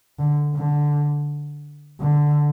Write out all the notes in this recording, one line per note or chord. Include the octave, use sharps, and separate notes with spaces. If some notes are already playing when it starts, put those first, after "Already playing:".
D3
D3
D3